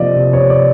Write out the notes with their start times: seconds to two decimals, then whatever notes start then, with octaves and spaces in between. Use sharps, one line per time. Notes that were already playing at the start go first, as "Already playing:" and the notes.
Already playing: C3 F3 A#3 D5 D#5
0.16 C3
0.33 C#5
0.39 C3
0.50 D5